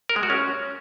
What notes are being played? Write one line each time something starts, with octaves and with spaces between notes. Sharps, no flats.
A#4
G#3
F#4
C#4